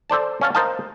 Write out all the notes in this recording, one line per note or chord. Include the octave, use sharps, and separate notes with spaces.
A4 C5 D5 A5
C#4 F5 A5
A#4 C5 D#5 F5 A5